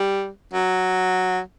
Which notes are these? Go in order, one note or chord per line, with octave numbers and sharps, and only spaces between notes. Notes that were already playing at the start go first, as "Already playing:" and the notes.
Already playing: G3
F#3